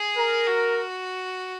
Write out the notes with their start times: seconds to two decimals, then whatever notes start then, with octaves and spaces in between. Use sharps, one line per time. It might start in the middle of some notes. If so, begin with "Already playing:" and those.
Already playing: G#4
0.17 A#4
0.47 F#4